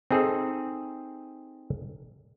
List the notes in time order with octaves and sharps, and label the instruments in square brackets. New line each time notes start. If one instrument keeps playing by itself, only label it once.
[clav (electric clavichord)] C4 D#4 G#4 A4